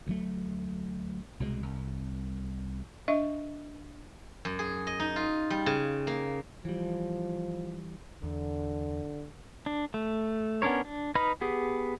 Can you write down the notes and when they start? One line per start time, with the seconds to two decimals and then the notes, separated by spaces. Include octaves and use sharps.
0.07 D2 F#3 A3
1.40 C2 B2 F3 G#3
1.62 C2
3.08 D4 D#5 E5 C#6
4.45 F#2
4.59 G#4
4.87 D#5
5.00 D#4
5.16 F4
5.50 G3
5.66 C#3
6.07 A#3
6.65 E3 F3 G3
8.23 E2 D3
9.66 D4
9.94 A3
10.62 B3 C#4 D4 A#4 C#5
10.85 D4
11.15 D#4 B4 D#5 B5 F6
11.41 B3 G4 G#4